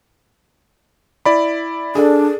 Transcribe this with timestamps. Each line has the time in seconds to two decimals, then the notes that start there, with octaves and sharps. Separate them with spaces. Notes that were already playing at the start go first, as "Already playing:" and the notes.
1.25 E4 D5 B5
1.95 D4 G#4 A4 D5